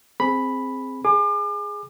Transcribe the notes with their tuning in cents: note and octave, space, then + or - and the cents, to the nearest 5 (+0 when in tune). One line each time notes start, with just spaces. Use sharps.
C4 +0 G#4 +0 B5 +0
G#4 +0 D6 +40